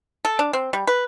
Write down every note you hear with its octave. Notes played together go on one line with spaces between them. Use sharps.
A4
D4
C4
G3
B4